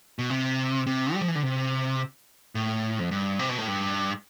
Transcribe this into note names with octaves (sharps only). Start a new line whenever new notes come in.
B2
C3
C3
G3
F3
E3
D3
C3
A2
F2
G2
C3
B2
A2
G2